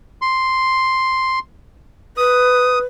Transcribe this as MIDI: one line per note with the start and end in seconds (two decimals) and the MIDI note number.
0.22 1.39 84
2.17 2.84 71
2.17 2.79 87